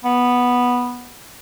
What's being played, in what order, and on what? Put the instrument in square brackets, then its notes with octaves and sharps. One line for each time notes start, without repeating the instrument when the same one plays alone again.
[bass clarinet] B3